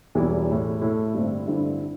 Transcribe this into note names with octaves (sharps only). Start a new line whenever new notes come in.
E1 E2 E3 G3 E4
A2 A3 E4
A2 A3 E4
G2 D3 C4 E4
G2 D3 C4 E4